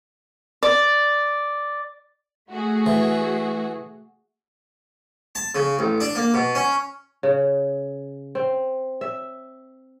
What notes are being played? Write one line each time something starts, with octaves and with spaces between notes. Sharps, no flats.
D5
A3 F#4 G#4
E3
A5
C#3
A1
D4
A#3
B2
C#4
C#3
C4
E5